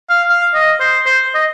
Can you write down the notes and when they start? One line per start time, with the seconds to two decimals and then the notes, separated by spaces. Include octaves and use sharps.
0.10 F5
0.29 F5
0.54 D#5
0.80 C5
1.06 C5
1.35 D#5